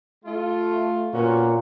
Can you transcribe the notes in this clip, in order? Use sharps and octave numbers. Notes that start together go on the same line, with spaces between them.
A3 F4
A#2 B3 C#4 F#4